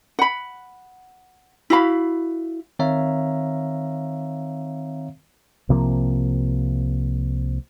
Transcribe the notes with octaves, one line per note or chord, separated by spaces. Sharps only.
F#5 B5
E4 F#4 F5 B5
D#3 C4 C#5 E5 F5 A#5
C2 C3 F3 A#3